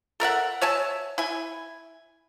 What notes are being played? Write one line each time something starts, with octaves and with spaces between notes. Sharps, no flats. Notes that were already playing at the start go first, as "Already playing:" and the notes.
A4 A#4 E5 F#5
C#5 E5 G#5 A5
E4 G#5